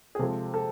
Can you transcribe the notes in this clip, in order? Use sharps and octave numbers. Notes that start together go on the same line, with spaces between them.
G#4
C3 F3 G#3 A4
A4